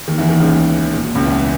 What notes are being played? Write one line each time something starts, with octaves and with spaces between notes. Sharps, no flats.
D#2 D#3
E2 E3
D#2 D#3
C#2 C#3
A#2
B2
C#2 C#3
E2 E3